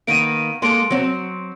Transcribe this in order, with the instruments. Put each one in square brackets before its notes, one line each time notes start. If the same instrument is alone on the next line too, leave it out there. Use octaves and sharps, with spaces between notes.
[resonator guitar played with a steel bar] D#3 A#3 B3 [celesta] D7 D#7
[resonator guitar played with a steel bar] G#3 A#3 A4 [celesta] C6 D7
[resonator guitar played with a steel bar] F#3 C4